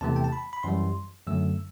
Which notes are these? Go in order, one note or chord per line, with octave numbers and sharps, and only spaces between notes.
E2 C3 E3 A3 A5
G5
A5
B5
B5
F#2 E3 G3 C6
F#2 D3 F#3 A3 E6